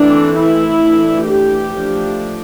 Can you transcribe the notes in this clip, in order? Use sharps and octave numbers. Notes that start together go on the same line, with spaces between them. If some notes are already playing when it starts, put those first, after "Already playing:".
Already playing: E3 A3 C4 D4
E4
E3 A3 D4
G4
F3 A3 D4